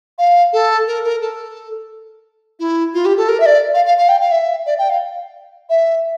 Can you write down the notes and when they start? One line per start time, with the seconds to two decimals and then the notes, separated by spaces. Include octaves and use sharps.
0.18 F5
0.53 A4
0.87 A#4
1.04 A#4
1.21 A4
2.59 E4
2.94 F4
3.05 G4
3.17 A4
3.28 A#4
3.40 E5
3.46 D5
3.74 F5
3.86 F5
3.98 F5
4.09 G5
4.20 F5
4.31 E5
4.66 D5
4.78 G5
4.90 F5
5.69 E5